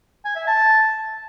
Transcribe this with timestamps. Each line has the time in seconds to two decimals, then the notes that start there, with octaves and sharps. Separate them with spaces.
0.25 G#5
0.36 E5
0.47 A5